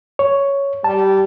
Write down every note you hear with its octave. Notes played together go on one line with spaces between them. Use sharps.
C#5
G3 A5